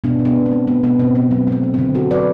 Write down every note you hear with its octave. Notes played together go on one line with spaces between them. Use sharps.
B2 B3 D4
B2
B3 D4
B2
C4
A3
A3 B3
B2 B3
B2 C4
B2 B3
F#3 C4
A3 C4
F#3
D3 C4
D3 F#4 A4
F#3 B4 D5